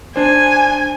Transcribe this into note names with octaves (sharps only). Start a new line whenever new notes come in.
D4 C5 G#5